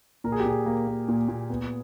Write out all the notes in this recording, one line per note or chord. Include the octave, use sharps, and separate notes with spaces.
A#2 A#4
G#4
G4
A#2 G#4
A#3
A#3
A#2
A#2
B3